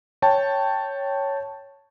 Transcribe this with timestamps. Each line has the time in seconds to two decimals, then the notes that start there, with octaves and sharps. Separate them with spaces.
0.22 C#5 G5 A5